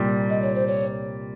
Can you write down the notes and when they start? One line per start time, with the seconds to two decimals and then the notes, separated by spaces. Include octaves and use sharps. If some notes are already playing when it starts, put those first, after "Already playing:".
Already playing: C2 A#2 G3
0.30 D#5
0.42 C#5
0.55 C5
0.67 C#5